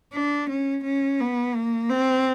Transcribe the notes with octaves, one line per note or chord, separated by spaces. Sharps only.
D4
C#4
C#4
B3
A#3
C4